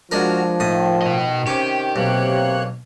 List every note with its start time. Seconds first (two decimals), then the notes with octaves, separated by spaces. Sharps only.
0.11 F3 G#3 D4 F#4 A#4 F6
0.60 A2 D#3 D#6
1.02 B2 D#5
1.47 C3 C#4 G4
1.96 B1 C3 A#3 C#5 F#6